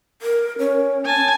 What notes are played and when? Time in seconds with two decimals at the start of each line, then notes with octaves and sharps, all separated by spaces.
0.22 A#4
0.59 C#4
1.05 G#5 A5